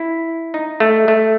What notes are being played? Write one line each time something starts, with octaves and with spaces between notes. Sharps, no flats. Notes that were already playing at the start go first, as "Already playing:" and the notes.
Already playing: E4
D#4
A3
A3